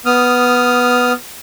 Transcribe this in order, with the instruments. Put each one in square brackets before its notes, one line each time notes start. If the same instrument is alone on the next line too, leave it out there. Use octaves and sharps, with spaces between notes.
[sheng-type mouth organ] B3 D#6 F6